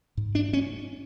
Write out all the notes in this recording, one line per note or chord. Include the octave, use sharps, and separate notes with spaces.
G#2
D4
C#4